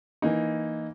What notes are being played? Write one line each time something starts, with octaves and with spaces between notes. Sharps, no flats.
E3 A#3 D#4